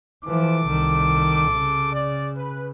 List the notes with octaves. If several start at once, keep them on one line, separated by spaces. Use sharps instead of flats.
E3 F3 A4 D6
C2 D#3
C#3
D5
B4